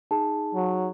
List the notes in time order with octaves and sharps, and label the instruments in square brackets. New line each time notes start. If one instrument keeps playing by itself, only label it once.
[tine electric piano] D#4 G#4 [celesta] A5
[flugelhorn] F#3